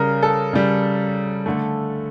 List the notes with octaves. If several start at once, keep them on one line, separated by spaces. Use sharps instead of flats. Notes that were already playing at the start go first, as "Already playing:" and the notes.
Already playing: C#3 G3 A#4
A4
C#3 G3
D3 A3